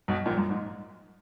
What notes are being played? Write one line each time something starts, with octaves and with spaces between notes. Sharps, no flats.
B1 B2
A#1 A#2
F#2
G#2